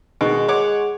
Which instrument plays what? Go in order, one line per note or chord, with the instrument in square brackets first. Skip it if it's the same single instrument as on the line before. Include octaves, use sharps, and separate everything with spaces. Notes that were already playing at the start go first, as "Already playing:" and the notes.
[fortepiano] B2 D#3 [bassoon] G#3
[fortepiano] C#5 F#5 D6